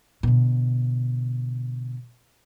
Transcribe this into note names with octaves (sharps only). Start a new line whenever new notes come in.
B2 D3